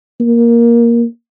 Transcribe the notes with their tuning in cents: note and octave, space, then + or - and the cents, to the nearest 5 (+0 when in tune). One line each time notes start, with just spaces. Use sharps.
A#3 +10